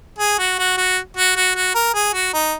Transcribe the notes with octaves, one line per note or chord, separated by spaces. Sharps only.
G#4
F#4
F#4
F#4
F#4
F#4
F#4
A#4
G#4
F#4
D#4